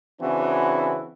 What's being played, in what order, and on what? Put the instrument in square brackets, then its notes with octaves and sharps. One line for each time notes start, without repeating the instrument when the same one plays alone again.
[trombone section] C#3 E3 C4 D4 E4 F#4